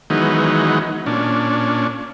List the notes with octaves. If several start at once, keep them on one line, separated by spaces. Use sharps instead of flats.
D#3 E3 F#3 G#3 B3 D#4
A#2 C#4 D4